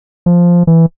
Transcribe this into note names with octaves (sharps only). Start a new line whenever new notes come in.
F3
E3